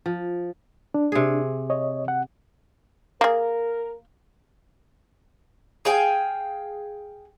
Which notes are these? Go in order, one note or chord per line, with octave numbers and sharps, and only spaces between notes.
F3
D4
C3 G#4
C#5 D#5
F#5
A#3 G#4 A#4
G#4 F5 G5 G#5